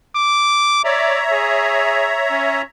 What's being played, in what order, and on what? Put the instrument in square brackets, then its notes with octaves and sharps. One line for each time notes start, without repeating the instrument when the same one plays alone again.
[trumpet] D6
[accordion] C#5 E5 A#5 [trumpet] D5
[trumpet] G#4
C#4